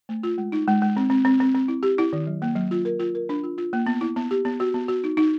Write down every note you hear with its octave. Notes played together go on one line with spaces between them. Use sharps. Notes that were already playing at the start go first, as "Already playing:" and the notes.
A3
F4
G#3
D#4
G#3
G#3
C4
C4
C4
C4
C4
E4
G4
E4
D#3
F#3
A#3
F#3
F4
A#4
F4
A#4
D4
F4
F4
A#3
B3
E4
B3
G4
B3
F#4
B3
F#4
D#4
D#4